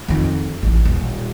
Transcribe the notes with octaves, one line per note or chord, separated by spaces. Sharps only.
F2 D#3
A1
D#1